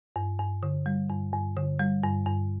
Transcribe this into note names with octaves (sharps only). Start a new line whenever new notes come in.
G2
G2
D3
G3
G2
G2
D3
G3
G2
G2